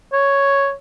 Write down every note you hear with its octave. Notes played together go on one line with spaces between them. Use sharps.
C#5